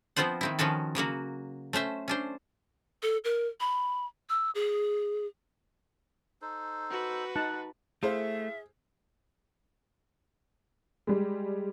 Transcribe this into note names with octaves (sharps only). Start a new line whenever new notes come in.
F3 B3 C4 F4 C5 F#5
D#3 C4 E4
D#3 F3 C#4 F#4 A4
C#3 F#3 A#3 F#4
A3 C#4 C5 E5
C#4 D4 C5
A4
A#4
B5
E6
G#4
D#4 A4 C5
F#4 B4
D#4 F#5 A5
A3 E4 G#4 C5 E5 F5
G3 G#3